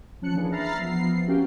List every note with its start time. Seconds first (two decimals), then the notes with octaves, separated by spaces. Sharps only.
0.22 F3 C#4 A5 F#6 C#7
0.34 E3 A#3 D4 G#4 B4
0.51 E5 A#5 B5 F6 A6 C7
0.79 F3 B3 C7
1.27 A#3 C#4 F#4 G4 F5 G5